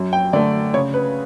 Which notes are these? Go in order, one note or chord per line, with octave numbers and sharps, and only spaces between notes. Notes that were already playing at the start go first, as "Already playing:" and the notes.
Already playing: F#2
G5
D3 A3 D5
C#3 C#5
B4